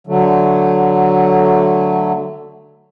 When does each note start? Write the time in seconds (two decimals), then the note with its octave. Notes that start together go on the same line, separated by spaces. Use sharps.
0.07 D3 F#3 A3